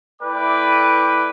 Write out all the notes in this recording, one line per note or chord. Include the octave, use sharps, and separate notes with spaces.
A3 E4 B4 D5 G5 D6